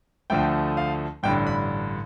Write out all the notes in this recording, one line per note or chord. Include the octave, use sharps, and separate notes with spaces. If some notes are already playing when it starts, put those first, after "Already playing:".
D2 D3 F3 A3 G5
F5
A1 G2 D3 G5
B5